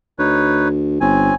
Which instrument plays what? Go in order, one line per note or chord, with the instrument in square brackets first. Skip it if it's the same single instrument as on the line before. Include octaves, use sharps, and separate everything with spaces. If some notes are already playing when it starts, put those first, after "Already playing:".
[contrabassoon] D2 [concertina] D#4 B4 C#5
[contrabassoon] G1 [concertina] C4 C#4 G#5